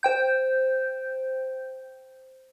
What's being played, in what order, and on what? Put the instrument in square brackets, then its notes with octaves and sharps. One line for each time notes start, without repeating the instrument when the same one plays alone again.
[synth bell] C5 G5 G6